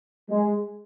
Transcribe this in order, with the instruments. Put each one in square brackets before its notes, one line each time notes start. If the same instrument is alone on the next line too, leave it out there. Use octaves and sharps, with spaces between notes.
[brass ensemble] G#3